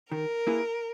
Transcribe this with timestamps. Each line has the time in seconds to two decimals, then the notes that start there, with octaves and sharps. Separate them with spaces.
0.11 D#3 A#4
0.47 A#3 E4 G#4 B4